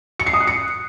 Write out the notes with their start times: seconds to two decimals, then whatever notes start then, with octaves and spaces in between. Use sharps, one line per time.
0.20 C#7
0.26 C7
0.33 D#6
0.40 F#6
0.47 C#7